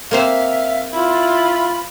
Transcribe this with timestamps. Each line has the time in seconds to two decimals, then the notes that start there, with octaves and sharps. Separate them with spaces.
0.11 A#3 C4 C5 E5 F5
0.93 E4 F4 B5